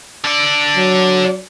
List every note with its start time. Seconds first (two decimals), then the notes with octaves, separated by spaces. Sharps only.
0.24 D3 D5
0.76 F#3